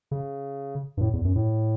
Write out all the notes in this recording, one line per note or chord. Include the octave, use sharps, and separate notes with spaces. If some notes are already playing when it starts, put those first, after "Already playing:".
C#3
G2
A2
E2
F#2
A2